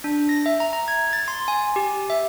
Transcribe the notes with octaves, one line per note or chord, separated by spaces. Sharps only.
D4
A#6
E5
A#5
A#5
G#6
A6
C6
G#5
G4
E5